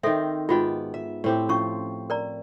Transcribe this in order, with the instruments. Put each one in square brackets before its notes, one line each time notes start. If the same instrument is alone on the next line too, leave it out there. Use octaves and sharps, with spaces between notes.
[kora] D#3 C4 [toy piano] A4 E5
[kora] G#2 B3 G5 [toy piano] F4 F#4 D#5
[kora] E5
A2 C4 G4
[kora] F3 [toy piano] C#4 C#6
[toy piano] A#4 D5 A#5